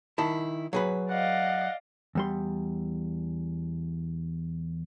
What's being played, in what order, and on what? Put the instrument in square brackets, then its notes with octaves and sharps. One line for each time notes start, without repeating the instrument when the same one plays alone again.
[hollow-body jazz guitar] D#3 E4 A5
F#3 G#4 B4
[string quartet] D5 D#5 F5 [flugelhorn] F#5
[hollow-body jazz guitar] E2 G3 C6